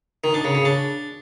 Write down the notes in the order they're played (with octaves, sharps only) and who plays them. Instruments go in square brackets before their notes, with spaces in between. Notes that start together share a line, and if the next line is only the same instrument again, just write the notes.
[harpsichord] D#3
D4
C#3
C#3
D4